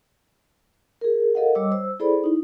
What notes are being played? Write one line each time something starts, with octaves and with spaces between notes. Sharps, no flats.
G#4 A#4
G4 A4 A#4 D#5 F5 F#5
G3 C#5 D#5 D6 E6
C5 E6
E4 G#4 A4 C5 D5 B5
D#4 E4